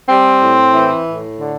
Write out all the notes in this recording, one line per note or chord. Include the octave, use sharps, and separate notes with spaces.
G3 C4
A2
E3
A2
D3